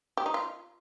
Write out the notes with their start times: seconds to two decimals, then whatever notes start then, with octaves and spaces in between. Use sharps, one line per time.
0.17 G4
0.26 D#4
0.34 F4